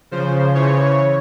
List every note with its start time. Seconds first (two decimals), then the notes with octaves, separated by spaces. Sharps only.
0.11 C#3 F3 C5
0.55 C#3 E3 C#5